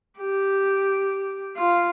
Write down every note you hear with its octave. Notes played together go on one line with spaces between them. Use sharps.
G4
F4